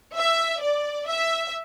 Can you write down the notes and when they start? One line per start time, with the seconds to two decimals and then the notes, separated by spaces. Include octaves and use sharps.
0.15 E5
0.61 D5
1.08 E5